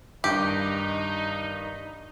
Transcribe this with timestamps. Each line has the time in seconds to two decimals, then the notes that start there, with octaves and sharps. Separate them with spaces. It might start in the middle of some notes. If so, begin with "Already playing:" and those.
0.24 G2 D#3 D#4 G4